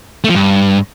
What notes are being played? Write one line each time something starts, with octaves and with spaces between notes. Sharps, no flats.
A3
F3
G2